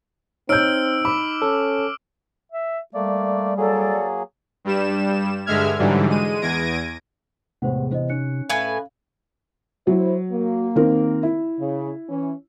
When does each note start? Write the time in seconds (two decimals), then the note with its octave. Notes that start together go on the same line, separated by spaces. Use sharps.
0.49 C4 D#4 C#5 E6 F6 G6 D7
1.05 B5 D6
1.42 C#4 A4
2.52 E5
2.94 G3 A3 A#3 D5
3.57 F#3 A#3 G#4 A4 D5
4.65 G2 G3 E7
5.46 G2 D3 G#3 E5 F6 G#6
5.79 G#2 D3 E3 F#3 G3
6.09 G#3 D#7
6.42 E2 G#6 A#6 D7 D#7
7.62 E2 A2 C3 G#3 C5 F#5
7.92 E3 B3 C5 D#5
8.10 C#4 D#4 F#6 C#7
8.50 A2 B4 F5 G#5
9.87 F#3 E4 C5
10.32 A#3
10.76 D#3 C4 A#4
11.23 E4
11.59 C#3
12.09 E3 C#4